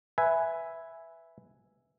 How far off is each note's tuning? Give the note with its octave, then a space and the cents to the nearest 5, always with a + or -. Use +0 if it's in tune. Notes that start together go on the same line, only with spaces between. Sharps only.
B4 +0 E5 +0 G#5 +0